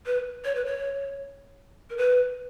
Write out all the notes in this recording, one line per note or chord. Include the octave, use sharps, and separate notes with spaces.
B4
C#5
B4
C#5
A#4
B4